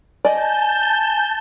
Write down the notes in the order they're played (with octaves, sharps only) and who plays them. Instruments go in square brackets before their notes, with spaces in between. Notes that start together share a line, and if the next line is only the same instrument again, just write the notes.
[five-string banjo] D5 D#5 [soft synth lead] G#5 [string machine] A5 G6